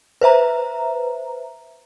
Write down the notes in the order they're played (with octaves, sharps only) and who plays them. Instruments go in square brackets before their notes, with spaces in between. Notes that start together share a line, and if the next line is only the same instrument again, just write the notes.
[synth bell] B4 C5 E5 A#5